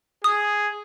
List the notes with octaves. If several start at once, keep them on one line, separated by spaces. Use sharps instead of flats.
G#4 D#6